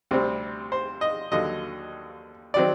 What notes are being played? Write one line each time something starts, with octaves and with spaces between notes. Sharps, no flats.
D2 C3 G3 C4
C5
D#5
D#2 D3 F#3 D#5
D#3 F#3 C4 D5